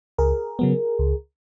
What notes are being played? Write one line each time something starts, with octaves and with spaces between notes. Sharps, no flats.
C#2 G#4 A#4
C#3 F#3 B3
C#2